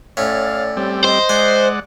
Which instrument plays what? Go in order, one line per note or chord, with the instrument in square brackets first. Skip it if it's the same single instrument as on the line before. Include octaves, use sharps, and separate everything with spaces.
[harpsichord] A2 C#4 [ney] D5 [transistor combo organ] F5
[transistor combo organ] G3 C4
[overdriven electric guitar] C5 [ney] D#5
[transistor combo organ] G#3 D5 F#5 [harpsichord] G#5